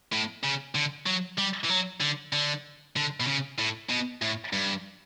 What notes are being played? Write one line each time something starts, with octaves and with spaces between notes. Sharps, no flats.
A2
C#3
D3
F#3
G3
E3
F#3
D3
D3
D3
B2
C#3
A2
B2
A2
G2